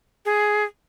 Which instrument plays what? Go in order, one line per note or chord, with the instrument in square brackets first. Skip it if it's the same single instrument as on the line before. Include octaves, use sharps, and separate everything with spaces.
[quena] G#4